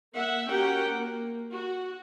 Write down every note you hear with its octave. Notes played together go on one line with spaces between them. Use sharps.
A#3 E5 F#5
C#4 F#4 G4 A#4 F#5 G5
A#3
F#4